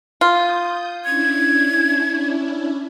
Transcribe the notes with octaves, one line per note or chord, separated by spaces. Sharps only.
F4 D#6 G6
C#4 D4 E4 G#6